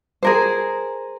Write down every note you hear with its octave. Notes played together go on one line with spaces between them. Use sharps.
G#4 A#4 C5